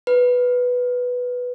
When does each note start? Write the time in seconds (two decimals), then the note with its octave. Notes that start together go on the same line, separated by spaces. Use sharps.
0.07 B4